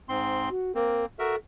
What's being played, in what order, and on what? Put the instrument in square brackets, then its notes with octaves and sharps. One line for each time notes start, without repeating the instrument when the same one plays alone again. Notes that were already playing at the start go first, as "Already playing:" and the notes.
[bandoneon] G#2 C4 C6
[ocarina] F#4
[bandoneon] A#3 C4 [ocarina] A#4
[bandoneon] F#4 A#4 E5 [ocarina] A4